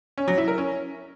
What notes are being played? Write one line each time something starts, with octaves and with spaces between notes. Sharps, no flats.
C#4
F#3
E4
A#4
C#4